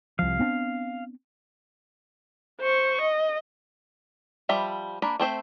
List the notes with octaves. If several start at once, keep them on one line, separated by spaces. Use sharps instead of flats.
C2 F3 F5
B3 C4 D4
C5 C#6
D#5
F3 G3 E5 B5
A#3 D4 B5
A3 C4 C5 E5